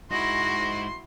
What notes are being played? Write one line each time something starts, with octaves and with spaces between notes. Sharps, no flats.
G#2 E4 F#4 D#5 C6 A#6